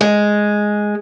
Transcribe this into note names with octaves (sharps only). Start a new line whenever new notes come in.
G#3